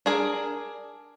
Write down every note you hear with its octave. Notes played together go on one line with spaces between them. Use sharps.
D4 G#4 A#4